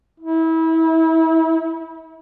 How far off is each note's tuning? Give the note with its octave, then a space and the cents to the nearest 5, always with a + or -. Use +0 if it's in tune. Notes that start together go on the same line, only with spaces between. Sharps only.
E4 -30